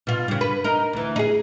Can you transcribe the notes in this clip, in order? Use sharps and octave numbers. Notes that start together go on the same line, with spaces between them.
B2 F4
G2 C#3
B4
D#4 A#4
D2 E3
D#4 G#4